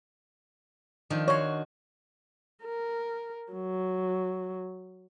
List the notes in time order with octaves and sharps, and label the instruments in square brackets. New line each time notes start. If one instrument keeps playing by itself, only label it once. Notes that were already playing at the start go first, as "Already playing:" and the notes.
[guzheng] D#3 F3 D4
[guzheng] F#4 C6 [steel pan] C#5
[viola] A#4
F#3